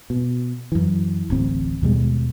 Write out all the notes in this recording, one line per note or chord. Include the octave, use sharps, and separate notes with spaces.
B2
F#2 E3
D1 A1 C4
D#2 B2 G3 G#3